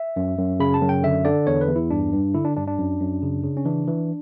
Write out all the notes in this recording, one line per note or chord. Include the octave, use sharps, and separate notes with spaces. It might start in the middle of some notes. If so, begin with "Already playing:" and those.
Already playing: E5
F#2
F#2
C#3 B5
A5
F#2
G5
D3 E5
D3 D5
E2 C#5
B4
E2
E4
G2 D4
G2
D3 E4
D4
G2 D4
D4
F#2
F#2
C#3
C#3
C#4
E3 D4
E3